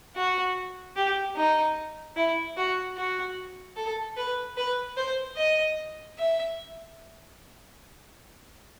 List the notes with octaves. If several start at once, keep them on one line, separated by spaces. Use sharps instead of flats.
F#4
G4
D#4
E4
F#4
F#4
A4
B4
B4
C5
D#5
E5